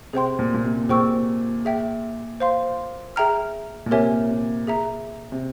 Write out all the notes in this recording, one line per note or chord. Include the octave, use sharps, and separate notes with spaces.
C3 G#4 C5 G5 C6
A#2
A#2
C3
A#2 G#4 C5 G5 C#6 E6
G#4 E5 G5
C5 F5 C6
G#4 E5 G5 A#5 F6
A#2
C3 G4 A#4 C#5 E5 G#5
C3
G#4 E5 A#5
C3